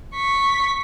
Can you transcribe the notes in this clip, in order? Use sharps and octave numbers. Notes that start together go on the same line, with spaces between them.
C#6 B6